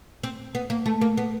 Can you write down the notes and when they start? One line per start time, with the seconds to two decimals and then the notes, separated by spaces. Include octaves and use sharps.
0.23 C4
0.55 B3
0.70 A#3
0.86 A3
1.01 A#3
1.17 B3